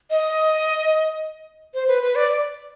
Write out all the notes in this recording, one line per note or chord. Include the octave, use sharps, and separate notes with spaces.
D#5
C5
B4
B4
D5